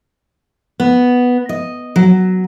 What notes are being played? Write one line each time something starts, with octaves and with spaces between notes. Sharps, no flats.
B3
D#5
F#3